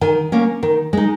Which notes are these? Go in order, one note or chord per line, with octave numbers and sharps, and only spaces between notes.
D#3 G#5
A#3 C#4
D#3
G#3 D#4